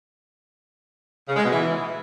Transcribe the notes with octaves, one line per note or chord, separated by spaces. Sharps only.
C#3
G#3
B2
E3